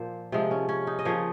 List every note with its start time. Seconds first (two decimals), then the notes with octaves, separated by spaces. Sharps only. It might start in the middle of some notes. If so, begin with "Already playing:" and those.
Already playing: A#2 F3 A#3 C5
0.32 C3 F3 G#3
0.51 C#4
0.69 C#4
0.87 D#4
0.99 D#5
1.05 C#3 F3 A#3 C#5